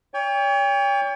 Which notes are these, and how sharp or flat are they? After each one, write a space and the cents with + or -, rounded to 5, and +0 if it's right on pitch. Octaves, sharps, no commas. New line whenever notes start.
C#5 +40 G5 +35